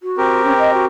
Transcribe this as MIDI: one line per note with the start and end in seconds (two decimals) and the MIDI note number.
0.02 0.41 66
0.18 0.85 60
0.18 0.85 67
0.18 0.85 70
0.45 0.53 61
0.58 0.73 75
0.73 0.84 66